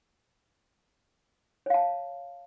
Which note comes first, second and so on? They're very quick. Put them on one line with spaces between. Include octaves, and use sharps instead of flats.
C#5 F5 A5